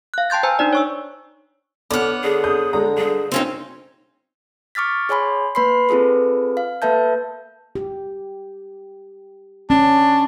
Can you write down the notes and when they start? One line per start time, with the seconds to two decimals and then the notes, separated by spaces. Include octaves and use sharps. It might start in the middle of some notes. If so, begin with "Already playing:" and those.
0.14 F5 F#6
0.30 G5 A5 C6 G6 A6
0.43 C5 G#5 A#5 E6
0.59 D4 D#4 D5
0.73 C#5 C#6 E6
1.91 D3 B3 C#5 D6 F6
2.23 D3 G#4
2.44 D#6 G6
2.73 D3 G#3 A#5
2.98 G1 G#4
3.32 C4 C#4 D#4
4.75 C#6 D6 F6 A6 B6
5.09 G#4 C#5 G#5 B5 C6
5.55 A#3 B4 B5 C6 C7
5.89 C4 F4 G#4 A4 B4
6.57 F5
6.82 A#3 A4 B4 E5 A5 G6
7.75 G4
9.70 C#4 D4